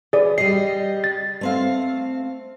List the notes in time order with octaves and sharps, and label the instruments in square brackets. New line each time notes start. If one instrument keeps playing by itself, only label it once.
[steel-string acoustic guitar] E3 [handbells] G#4 D5
[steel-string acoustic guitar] G3 D#5 [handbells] C7
[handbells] A6
[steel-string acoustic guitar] A3 C4 F5